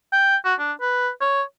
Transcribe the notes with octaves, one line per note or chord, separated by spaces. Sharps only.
G5
F#4
D4
B4
C#5